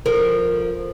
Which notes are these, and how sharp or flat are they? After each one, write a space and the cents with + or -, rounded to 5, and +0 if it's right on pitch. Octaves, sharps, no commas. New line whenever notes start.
F3 +0 A#4 +0